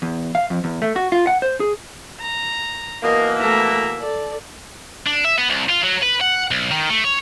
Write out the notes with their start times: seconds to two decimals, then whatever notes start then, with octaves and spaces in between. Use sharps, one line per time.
0.02 E2
0.35 F5
0.50 F2
0.64 E2
0.82 A3
0.96 F#4
1.12 F4
1.27 F#5
1.42 C5
1.60 G#4
2.21 A#5
3.03 B2 E3 A#3 A#4 D#5
3.39 A3 E5 A#5
4.00 A4 D5
5.07 D4
5.25 E5
5.38 B3
5.50 C2
5.70 F4
5.84 F#3
6.03 B4
6.21 F#5
6.51 B1
6.71 D#3
6.90 A3
7.04 C#5